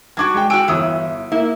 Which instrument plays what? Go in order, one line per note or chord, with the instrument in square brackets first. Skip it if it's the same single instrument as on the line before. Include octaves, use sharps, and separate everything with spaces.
[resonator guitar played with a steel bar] G3 D4 F#4 [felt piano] C#6 D6 G#6
[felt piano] G#3 G5
[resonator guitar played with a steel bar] F#4 G#5 [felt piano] G5 E6 D7
[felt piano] G1 D#6 E6 [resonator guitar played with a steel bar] E3
[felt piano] A#3 [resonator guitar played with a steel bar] E4